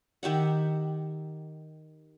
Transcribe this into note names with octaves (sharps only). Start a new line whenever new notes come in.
D#3 G4 E5 F#5